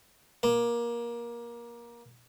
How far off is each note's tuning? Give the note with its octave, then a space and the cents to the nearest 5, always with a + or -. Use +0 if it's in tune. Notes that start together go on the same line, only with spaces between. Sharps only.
A#3 +20